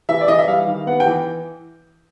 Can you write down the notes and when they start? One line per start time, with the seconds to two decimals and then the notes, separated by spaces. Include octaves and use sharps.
0.09 E3 E5
0.21 D5
0.28 E3 D#5
0.39 E5
0.47 G3 F5
0.67 D#3
0.86 B3 F#5
1.00 G5
1.07 E3